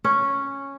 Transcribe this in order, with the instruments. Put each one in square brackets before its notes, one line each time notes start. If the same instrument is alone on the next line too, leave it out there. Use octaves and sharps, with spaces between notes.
[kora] C#4